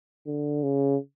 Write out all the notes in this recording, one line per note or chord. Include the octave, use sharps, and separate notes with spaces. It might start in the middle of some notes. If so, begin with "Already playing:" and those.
D3
C#3